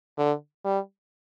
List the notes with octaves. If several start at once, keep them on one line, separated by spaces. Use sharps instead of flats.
D3
G3